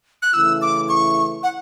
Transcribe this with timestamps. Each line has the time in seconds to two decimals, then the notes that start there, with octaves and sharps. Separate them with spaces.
0.22 F#6
0.33 C#3 E3 A3 E4 E6
0.62 D6
0.89 C#6
1.43 F#5